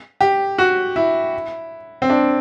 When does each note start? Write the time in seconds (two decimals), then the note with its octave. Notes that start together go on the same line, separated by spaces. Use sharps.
0.21 G4
0.58 F#4
0.96 E4
2.02 C4
2.10 D4